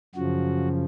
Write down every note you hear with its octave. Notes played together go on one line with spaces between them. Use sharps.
F#2 C#3 F3 F#4